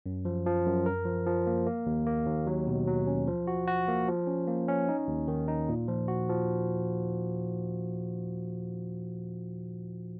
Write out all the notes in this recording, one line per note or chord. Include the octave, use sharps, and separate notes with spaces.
F#2
F3
F3
F#2
A#4
F3
F3
A#3
A#3
D#2
A#3
D#2
F#3
B2
F#3
C#4
F3
F#4
F#4
A#3
F3
C#4
A#3
C#4
D#4
D#2
D#3
D#4
A#2
F3
F#4
F3